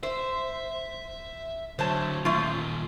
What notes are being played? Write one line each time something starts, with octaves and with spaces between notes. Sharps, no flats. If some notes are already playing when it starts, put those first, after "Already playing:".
C5 E5
D3 F#3 C5 C#5 A5
D#2 A#2 A3 F4